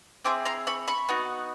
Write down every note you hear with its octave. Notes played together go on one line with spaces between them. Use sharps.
C4 E4 G#4 C6 D6
A#5 C6
B5 C#6
B5 C#6
B3 D#4 F#4